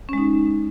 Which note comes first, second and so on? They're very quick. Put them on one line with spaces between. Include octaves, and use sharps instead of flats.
C#4 G#3 D#4